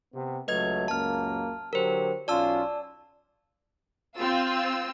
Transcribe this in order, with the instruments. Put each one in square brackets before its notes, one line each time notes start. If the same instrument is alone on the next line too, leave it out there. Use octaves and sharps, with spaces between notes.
[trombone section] C3 B3
[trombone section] C#2 F#3 A3 [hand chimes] B4 D#5 G#6
[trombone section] C#2 F#2 A#3 [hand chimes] A5 F6
[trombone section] D3 F#3 G4 [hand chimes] A#4 C5
[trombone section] B1 C#4 F4 [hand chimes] D5 A5 E6
[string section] C4 F4 E6